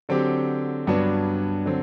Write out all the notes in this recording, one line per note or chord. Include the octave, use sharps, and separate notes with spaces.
D3 F#3 C4 G4
G2 F#3 B3 D4 F#4
D3 F#3 C4